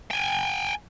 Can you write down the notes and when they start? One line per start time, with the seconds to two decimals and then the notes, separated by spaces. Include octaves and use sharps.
0.11 G5 G#5